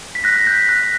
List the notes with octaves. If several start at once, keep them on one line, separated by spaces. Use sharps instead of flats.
B6
F#6 A#6
A#6
G6 B6
F#6 A#6